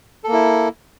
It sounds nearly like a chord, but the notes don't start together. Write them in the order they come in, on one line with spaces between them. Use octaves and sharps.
A4 A#3 E4